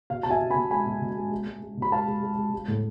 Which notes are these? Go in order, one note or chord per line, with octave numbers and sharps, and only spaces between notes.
B2 F5
B2 A5
E5 G#5
B2
G#5 B5
B2
G#3 G#5 B5
B2
B2
G#3
G#3
G#3
G#3
B2
B5
G#3 F5 A5
G#3
G#3
G#3
G#3
A2